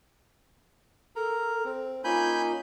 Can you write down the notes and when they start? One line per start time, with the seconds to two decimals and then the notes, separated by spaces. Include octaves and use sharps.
1.16 A4 A#4 A#5
1.65 C4
2.04 A#3 C#4 D#4 F4 G#5 B5 G6